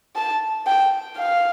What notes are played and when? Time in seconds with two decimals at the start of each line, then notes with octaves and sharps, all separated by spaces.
0.16 A5
0.67 G5
1.18 F5